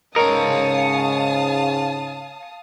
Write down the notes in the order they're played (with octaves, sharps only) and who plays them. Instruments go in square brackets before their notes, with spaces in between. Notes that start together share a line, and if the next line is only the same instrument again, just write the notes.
[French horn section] G#2 C#3 [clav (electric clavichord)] A#4 [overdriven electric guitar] C#5 D#5 [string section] F5 A5 D#6